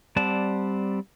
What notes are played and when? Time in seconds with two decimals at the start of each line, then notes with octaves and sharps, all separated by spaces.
0.16 G3 C4 D5 F#5 A5